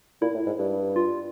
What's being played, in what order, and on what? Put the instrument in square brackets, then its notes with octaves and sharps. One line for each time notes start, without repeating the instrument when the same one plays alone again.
[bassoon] A#2 [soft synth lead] E4
[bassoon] A2
G#2
G2
[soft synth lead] F4